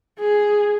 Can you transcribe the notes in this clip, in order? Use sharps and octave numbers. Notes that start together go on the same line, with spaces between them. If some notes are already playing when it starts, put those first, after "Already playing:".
G#4